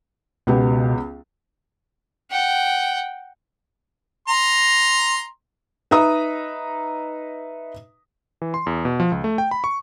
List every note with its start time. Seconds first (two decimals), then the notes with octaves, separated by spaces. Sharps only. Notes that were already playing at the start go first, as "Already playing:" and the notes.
0.47 C#2 B2 B3 G4
2.31 F#5 G5
4.28 A#5 C6
5.91 D#4 B4 E5 A#5 D#6
8.42 E3
8.54 C6
8.66 E2
8.85 B2
9.00 F3
9.12 C#2
9.24 A3
9.38 G5
9.51 B5
9.64 C#6